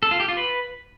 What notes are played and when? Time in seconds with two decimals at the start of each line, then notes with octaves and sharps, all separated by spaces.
0.03 A4
0.11 F4
0.20 G4
0.28 F4
0.37 B4